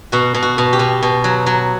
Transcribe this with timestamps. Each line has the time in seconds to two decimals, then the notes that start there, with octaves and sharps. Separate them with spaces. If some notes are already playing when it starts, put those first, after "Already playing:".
0.12 B2 F#4
0.34 B2
0.42 F#4
0.58 B2
0.73 G4
0.79 B2
1.02 B2
1.24 F#3
1.46 F#3